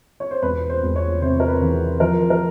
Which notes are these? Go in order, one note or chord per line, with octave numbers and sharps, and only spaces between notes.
C#5
C5
E1 B4
C5
E1
C#5
C3 C5
A#4
B4
E2
F3 A#4
A#4